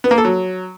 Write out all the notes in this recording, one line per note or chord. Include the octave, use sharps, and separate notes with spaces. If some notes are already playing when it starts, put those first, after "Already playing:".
B3
A#3
A4
F#3